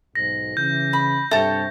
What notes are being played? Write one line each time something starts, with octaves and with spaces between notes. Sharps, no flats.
B1 G#2 A#6
C#3 E3 G6
B5
G2 C3 A4 C#5 E5 G5 A6